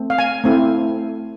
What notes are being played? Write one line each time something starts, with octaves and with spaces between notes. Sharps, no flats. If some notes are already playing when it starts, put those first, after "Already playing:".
Already playing: A3 C4
F5
G#5
A3 C4 E4